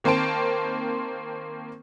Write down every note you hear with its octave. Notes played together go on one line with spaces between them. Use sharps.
D#3 A#3 C4 C5 A5 D7